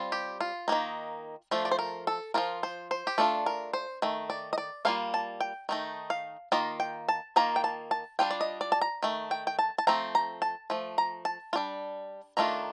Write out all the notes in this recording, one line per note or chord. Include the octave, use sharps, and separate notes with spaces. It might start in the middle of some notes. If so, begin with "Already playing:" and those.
Already playing: G3 C4 F4
G4
F4
D#3 A#3 D#4
F3 A3 D4 F4
D5
C5
A#4
A4
F3 A#3 F4 A#4
C5
C5
G4
A3 D4 F4 A4
A#4
C5
D#3 A3
D5
D#5
D5
G3 A#3 F4 F5
A5
G5
D#3 A3 D#4
F5
D#3 A#3 F4 D#5
G5
A5
D#3 A#3 F4 A#5
G5
A5
A5
G3 D4 F4 G5
D5
D#5
D5
A5
A#5
D#3 A3
G5
G5
A5
A5
F3 A3 C4 A#5
A#5
A5
F3 A3
A#5
A5
F4
G3 D4
D#3 A3 D4 F4 A#5